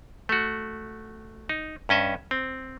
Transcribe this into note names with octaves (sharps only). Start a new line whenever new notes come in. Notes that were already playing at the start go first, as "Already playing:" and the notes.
A3 F#4
D#4
G2 C#4 D#5 E5
C4